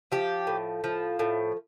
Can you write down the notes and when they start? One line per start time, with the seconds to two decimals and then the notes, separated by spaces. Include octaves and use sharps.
0.12 F3 G4
0.47 A2
0.84 F3
1.19 A2